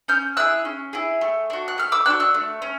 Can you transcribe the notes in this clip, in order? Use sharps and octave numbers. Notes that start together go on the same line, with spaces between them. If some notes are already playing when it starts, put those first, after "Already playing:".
C#4 F6 G6
E4 G#4 E6 F#6
C#4
E4 G#4
A3
D4 F#4
F#6
A3 F6
D6 E6
D4 F#4 E6 F#6
E6 F#6
A3
C#4